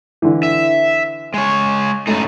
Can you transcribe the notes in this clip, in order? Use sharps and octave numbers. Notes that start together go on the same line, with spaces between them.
D3 E3
E5
G#3 C#5
F#2 A2 A3 D#4